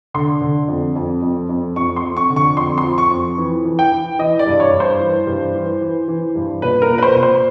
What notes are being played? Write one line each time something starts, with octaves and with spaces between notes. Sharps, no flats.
D3 C6
D3
F2
F2
F2
F2
F2 C#6
C6
F2
C#6
D3
C#6
F2 C6
C6
F3
C#6
F2
E3
E3
G5
E3
E3 D#5
D5
G2
C#5
G2
C5
E3
G2
E3
E3
E3
G2
A#2 B4
A#4
A#2
B4
C5
A#2
C5